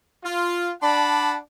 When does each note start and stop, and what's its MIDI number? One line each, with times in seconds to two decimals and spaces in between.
0.24 0.71 65
0.82 1.37 62
0.82 1.37 74
0.82 1.37 78
0.82 1.37 81
0.82 1.37 83